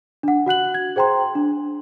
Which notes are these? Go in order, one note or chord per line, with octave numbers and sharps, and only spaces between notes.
D4 F#5
F#4 F#5 F#6 F#7
G#6
G#4 C5 G5 A#5 C6
D4